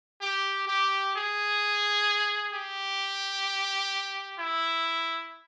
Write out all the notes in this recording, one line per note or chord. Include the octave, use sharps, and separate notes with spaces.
G4
G4
G#4
G4
E4